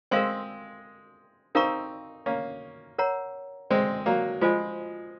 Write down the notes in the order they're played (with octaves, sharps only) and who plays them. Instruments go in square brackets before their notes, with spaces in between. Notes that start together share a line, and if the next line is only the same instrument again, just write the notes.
[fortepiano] G#3 C4 [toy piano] A#4 F5 C6
[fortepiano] C4 D#4 [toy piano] A#4 F5 A#5 C#6
[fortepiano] A#3 C#4
[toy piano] A#4 C#5 F#5 A#5
[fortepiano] G#3 C4
F#3 A#3
[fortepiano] F3 G#3 [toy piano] F4 C5 D#5 G#5